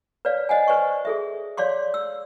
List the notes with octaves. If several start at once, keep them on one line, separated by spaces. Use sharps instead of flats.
B4 C#5 D5 F5
C5 D#5 F#5 G#5
B4 C5 D5 G#5 C#6
G#4 A4 E5
C#5 D5 F5 C6 D6
E6